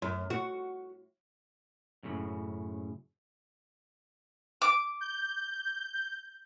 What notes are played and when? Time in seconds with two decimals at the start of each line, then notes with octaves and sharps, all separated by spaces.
0.02 F#2
0.30 F#4
2.03 F#2 A2 C#3
4.62 D6
5.01 G6